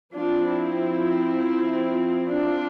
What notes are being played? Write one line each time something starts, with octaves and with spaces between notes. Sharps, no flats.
F3 C4 D4 F4
E4
D4 F4